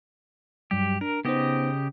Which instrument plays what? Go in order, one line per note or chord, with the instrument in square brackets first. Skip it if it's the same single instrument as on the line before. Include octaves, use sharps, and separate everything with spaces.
[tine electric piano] G2 F#3 G3 [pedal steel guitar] G4
[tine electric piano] D4 [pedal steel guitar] A#4
[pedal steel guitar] C#3 G4 D#5 [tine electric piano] B3 D#4 C5